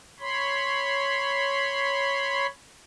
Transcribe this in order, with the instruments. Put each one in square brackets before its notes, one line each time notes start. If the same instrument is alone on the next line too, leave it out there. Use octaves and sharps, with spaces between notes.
[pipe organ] C#5 B5 C6